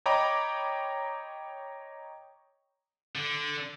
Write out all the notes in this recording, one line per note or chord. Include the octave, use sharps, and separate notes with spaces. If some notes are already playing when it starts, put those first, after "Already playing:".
C#5 D#5 G5 A#5 B5 D6
D3